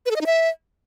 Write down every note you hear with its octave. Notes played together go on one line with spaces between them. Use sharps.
B4
A4
D#5
D#4
E5